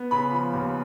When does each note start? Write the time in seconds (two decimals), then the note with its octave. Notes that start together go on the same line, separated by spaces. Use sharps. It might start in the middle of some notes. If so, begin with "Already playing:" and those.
Already playing: B3
0.11 C#3 B5
0.32 F3
0.53 D#2